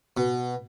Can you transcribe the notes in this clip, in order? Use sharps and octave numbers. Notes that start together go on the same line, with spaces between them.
B2